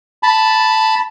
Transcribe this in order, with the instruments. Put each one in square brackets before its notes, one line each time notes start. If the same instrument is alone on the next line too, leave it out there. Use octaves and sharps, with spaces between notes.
[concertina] A5 B5